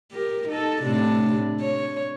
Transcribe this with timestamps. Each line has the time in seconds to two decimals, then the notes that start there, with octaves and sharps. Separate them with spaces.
0.12 G4 A#4
0.48 D#4 A4
0.82 A2 C3 D4
1.60 C#5